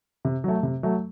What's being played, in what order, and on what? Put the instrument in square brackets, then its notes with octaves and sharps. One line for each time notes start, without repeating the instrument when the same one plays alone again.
[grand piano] C3
F#3 A3
C3
F#3 A3